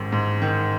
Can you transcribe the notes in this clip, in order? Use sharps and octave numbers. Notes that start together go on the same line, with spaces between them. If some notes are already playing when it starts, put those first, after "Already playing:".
Already playing: A1 G#2 D#3
G#2
D#3